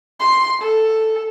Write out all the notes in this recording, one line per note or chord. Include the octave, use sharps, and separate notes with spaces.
C6
A4